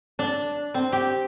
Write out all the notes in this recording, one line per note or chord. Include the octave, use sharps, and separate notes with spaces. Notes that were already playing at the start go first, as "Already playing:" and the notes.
D4
C4
G4